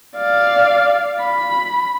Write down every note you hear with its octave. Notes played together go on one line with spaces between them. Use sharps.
D5 F5
B5